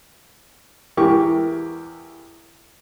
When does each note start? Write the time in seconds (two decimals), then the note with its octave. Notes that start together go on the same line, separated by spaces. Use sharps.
0.97 E2 E3 G4 A#4 C#6 D6